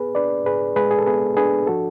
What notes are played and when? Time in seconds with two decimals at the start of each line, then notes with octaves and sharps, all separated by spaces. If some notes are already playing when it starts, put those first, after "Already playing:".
Already playing: B3 G#4 B4
0.15 D4 B4 D5
0.46 G#2 G#4 B4
0.76 G#3 G#4 B4
0.91 G#4
0.98 A4
1.07 B3 G#4 B4
1.37 D4 G#4 B4
1.67 F3 F#4 A4